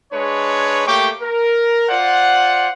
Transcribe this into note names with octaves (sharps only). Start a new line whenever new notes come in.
G#3 D4 B4 C#5
A3 A#3 G4 G5 C#6 D6
A#4
F4 C5 D5 F#5